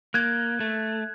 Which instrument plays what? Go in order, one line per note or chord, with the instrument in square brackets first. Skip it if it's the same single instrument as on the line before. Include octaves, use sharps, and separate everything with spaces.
[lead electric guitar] A#3 [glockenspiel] F#6 G#6
[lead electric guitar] A3